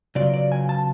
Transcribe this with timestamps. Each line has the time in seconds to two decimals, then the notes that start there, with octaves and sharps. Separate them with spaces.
0.15 C#3 F#3 B3 F4 D5
0.34 D5
0.52 G#5
0.69 A5